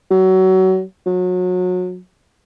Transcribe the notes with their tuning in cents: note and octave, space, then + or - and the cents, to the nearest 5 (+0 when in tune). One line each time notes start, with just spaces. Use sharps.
F#3 +25
F#3 -30